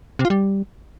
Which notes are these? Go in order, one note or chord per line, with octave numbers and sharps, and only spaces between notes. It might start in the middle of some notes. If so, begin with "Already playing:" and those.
C3
F4
G3